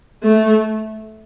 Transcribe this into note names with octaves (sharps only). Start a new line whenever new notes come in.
A3